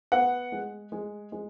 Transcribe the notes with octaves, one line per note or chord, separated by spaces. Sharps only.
B3 F#5
G#3
G#3
G#3